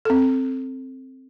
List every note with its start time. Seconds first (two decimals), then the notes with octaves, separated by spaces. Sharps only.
0.05 C4 A4